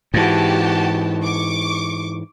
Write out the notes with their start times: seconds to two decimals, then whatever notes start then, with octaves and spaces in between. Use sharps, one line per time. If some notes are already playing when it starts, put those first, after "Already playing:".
0.14 G#2 E3 F#4 G4 A5
1.22 C#6 D6